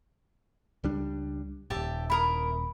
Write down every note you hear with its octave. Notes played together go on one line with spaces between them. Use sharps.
C#2 G3 D4
D#1 G#1 G4 E5 A5
E4 A#4 B5 D#6